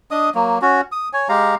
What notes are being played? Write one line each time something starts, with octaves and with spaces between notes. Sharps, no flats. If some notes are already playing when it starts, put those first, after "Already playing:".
D4 D#5 D#6
F#3 A#3
C#4 F#4
D#6
C#5 G#5
G#3 G4 F5 A#5